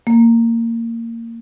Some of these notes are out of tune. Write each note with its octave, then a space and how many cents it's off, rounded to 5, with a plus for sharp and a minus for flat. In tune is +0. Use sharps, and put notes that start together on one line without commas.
A#3 -20